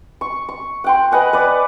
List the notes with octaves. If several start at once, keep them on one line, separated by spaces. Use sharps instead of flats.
C#6
C#6
F#5 G5 C6
B4 D#5 F#5 G#5
B4 D5